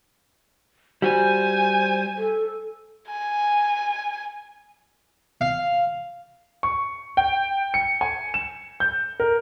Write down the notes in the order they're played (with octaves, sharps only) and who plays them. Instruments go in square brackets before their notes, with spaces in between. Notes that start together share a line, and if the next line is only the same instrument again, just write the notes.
[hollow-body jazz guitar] G3 F#4 [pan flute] C5 [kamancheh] G#5
[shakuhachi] A4
[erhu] G#5
[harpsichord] F5
[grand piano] C#6
G5
C#7
G#5
E7
G6
A#4